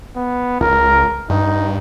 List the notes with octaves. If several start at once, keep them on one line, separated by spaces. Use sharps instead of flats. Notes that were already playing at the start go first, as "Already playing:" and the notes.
B3
C#2 A#4
G2 D#4